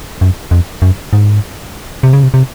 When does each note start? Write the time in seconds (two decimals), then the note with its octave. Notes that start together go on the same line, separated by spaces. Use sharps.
0.21 F#2
0.51 F2
0.82 F#2
1.13 G#2
2.03 C3
2.13 C#3
2.23 C3
2.34 C3